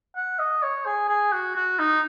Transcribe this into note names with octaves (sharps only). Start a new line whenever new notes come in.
F#5
D#5
C#5
G#4
G#4
F#4
F#4
D#4